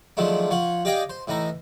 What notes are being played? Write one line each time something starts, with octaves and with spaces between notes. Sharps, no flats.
D#3 F3 F#3 G#3 A3 D4
F3 C#5 F#5
G4 D5 D#5 F5 G5 G#5
C5
A2 E3 D#4 A#5